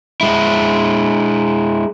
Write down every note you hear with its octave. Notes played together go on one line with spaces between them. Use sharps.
G#3 E4